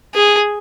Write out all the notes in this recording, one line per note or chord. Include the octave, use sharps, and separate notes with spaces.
G#4